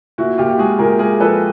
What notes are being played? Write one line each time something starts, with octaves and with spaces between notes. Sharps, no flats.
A#2 E4 F#4
A#2 F4 G4
G4
G#3 F#4 G#4
A#2 G#4 A#4
G#3 G#4 A#4
F3 A4 B4